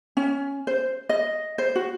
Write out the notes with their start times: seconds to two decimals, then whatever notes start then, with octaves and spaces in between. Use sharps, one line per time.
0.17 C#4
0.67 C5
1.09 D#5
1.58 C5
1.75 F#4